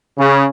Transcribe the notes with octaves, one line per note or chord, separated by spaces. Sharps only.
C#3